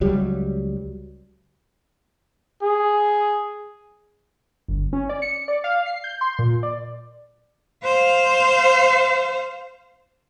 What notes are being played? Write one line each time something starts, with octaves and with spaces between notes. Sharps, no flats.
C#2 F#3 G3
G#4
G1
C#4
D5
C#7
D5
F5
C7
G6
C6
A#2
D5
C5 F5